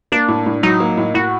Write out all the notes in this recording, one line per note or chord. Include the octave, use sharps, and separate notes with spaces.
A#3 D4
A2
A2
F#3 D#4
A#3
A2
A2 F#4